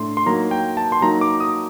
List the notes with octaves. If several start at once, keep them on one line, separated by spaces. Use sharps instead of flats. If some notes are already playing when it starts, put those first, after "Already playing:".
Already playing: A2 A3 D4 C6
C6
F#3 A#3 D#4 A#5
G5
A5
C6
F#3 A#3 D#4 A#5
D6
D#6